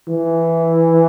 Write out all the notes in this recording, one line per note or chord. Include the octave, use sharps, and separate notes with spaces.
E3